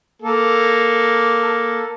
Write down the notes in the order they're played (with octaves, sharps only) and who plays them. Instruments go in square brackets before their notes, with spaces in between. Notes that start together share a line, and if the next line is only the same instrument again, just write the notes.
[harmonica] A#3 A4